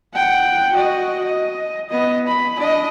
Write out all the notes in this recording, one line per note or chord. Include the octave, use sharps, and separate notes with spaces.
F#5 G5
F#4 D#5
D#5
B3 D#5
B5
D4 D#5